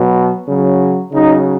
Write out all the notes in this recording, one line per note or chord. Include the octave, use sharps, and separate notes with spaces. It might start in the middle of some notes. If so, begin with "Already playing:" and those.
Already playing: B2 F#3
C#3 F#3
C#3 F#3 D#4